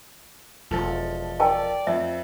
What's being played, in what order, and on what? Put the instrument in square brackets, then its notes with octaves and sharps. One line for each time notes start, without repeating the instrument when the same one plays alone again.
[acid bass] E1 [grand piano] F3 A4
[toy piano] A#4 G5 A5 [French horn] D5
[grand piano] F2 [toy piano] E5